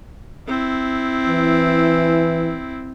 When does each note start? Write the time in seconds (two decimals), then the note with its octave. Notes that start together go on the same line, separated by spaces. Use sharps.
0.48 C4 E4
1.28 E3